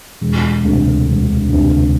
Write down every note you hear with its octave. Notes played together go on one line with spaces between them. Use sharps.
E1
D2 C3
E1
D2 C3